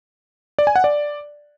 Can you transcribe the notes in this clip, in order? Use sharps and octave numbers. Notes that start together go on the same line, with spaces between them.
D5
G#5
F#5
D5